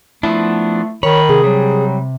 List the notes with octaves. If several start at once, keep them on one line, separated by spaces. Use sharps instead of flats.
F3 A3 B3 D4 E4
D#3 C#5 B5
C3 G#4
F#3 G3